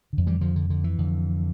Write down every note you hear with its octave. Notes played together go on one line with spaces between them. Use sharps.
F2 D3
E3 G3
D3 F3
D3
D3
E3
F2 D3